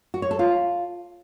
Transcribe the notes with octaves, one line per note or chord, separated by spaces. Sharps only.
F#4
C#5
A4
F4